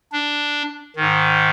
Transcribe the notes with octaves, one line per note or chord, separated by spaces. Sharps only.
D4
G#2 D#3